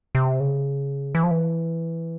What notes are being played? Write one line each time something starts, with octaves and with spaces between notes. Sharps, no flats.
C3
C#3
E3
F3
E3